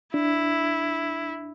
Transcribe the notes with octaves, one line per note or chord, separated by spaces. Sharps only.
D4 E4